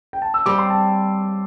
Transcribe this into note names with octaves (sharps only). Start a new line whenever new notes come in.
G5
A5
E6
G3 C4 D6
C6
A5